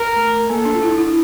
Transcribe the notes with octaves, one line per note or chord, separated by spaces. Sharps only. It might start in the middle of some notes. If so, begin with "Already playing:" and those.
Already playing: A#4
A3
A#3 A4
D4
F4
E4
E4